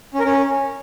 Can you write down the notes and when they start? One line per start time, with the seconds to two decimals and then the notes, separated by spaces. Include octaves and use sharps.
0.15 C#4
0.20 A#4
0.25 C#4